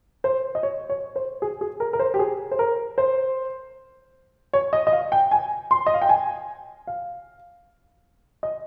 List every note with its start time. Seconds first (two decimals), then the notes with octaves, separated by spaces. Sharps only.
0.24 C5
0.55 D#5
0.63 C#5
0.90 C#5
1.16 C5
1.42 G#4
1.61 G#4
1.80 A#4
1.93 A#4
1.99 C5
2.14 G4
2.19 G#4
2.51 C5
2.59 A#4
2.98 C5
4.53 C#5
4.73 D#5
4.87 D#5
4.93 F5
5.12 G5
5.31 G#5
5.71 C6
5.86 D#5
5.94 F5
6.02 G5
6.09 G#5
6.87 F5
8.43 D#5